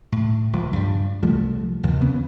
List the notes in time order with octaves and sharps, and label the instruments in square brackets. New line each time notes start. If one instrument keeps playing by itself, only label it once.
[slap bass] A2
D#1 C#2 F3
G2 G3
C2 F3 G3 A3
D#2 C3 F3
C#3 B3 C#4